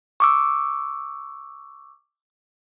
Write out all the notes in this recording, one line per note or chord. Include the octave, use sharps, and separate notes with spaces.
C#6 D6 E6